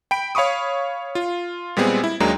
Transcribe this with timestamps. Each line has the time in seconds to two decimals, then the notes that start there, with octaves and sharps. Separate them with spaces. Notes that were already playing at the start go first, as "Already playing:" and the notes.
0.11 G5 B5 D7
0.35 C#5 F5 B5 C#6 D#6
1.15 F4
1.77 A#2 G3 G#3 B3 C4 G#4
2.04 E4
2.20 D#2 F#3 G#3 A#3 D4 A#5